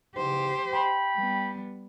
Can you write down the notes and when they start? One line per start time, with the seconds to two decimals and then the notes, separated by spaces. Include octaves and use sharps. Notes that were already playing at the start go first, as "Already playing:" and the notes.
0.16 E2 G#2 C#3 G4 C5
0.72 G5 B5
1.16 G3 B3